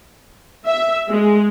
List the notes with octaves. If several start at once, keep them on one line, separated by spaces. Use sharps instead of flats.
E5
G#3